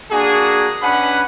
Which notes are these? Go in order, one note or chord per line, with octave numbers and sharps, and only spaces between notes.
A#3 D4 F#4 G#4
C#4 D4 B4 F#5 G#5 B5